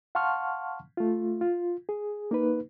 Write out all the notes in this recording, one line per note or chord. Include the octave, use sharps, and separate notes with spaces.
F5 F#5 A5 C6 C#6 F6
A3 F4
F4
G#4
A#3 D#4 B4